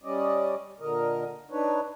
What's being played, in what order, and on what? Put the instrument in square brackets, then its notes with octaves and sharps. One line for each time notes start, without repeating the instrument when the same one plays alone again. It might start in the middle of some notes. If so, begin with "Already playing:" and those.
[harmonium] G3 C#4 D5 D#5
A#2 D3 A#4 D#5
D4 D#4 B4 C#5